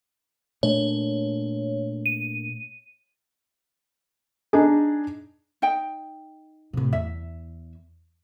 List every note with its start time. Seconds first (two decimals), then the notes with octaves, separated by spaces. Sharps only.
0.63 A#2 A3 D4 C#5
2.06 D#7
4.53 D4 D#4 G#4
5.62 D#4 G5
6.73 A2 C3
6.93 E2 E5